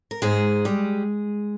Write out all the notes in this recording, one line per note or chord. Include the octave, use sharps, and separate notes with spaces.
A#4
G#2 G#3 G#4
G3